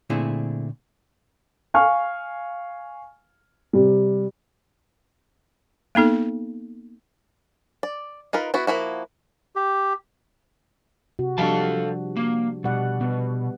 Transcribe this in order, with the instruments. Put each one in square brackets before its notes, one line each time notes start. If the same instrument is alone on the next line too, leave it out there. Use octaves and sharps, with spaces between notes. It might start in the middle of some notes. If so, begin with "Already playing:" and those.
[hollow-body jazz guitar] A#2 D3 A3 C4 E4 G#4
[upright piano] F5 G#5 C#6 F6
C3 G3
[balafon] A#3 B3 D#4 A4
[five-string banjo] D5
D#4 F4 A#4 B4
B3 E4 F#4
F3 A#3 E4 F#4
[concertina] G4
[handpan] C3 F#4
[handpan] F3 G3 D4 [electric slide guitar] A4 F5 A5
[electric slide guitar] A#3
[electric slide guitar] B2 [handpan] G3 D5 F#5
[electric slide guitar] B2 [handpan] B3